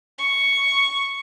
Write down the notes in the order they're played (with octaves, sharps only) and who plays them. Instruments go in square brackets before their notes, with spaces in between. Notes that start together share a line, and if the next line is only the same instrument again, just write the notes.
[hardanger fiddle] C#6